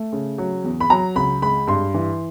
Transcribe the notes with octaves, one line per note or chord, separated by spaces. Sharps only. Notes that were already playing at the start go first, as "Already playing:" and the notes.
Already playing: A3
C#3
F#3
E2
B5
F#3 A#5
C#2 B5
G#3 B5
G2 C6
E3